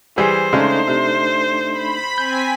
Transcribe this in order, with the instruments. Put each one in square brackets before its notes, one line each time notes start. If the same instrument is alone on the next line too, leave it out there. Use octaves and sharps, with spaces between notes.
[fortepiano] E3 G3 G#4 [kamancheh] C5
[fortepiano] C#3 G#3 [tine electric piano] A3 D4 D#4
[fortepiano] C3
[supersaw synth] B5
[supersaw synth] C4 G#5 B6 [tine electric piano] G6